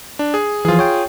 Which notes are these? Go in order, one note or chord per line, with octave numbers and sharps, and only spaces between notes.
D4
G#4
E3 F3 F4 G#4
C#5 G5